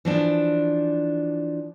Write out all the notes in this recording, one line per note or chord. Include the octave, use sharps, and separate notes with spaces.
E3 F3 D4